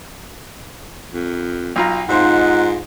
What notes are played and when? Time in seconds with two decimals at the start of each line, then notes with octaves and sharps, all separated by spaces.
1.13 F2
1.76 B1 F4 A#5
2.09 G#2 C4 D#4 F4 C5 F#5